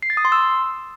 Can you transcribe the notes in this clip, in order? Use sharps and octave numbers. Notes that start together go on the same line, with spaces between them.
C7
A6
D#6
C6
E6